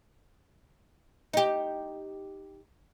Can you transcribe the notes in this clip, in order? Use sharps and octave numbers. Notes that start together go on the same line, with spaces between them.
D#4 G4